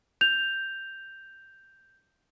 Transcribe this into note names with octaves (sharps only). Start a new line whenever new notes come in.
G6 F7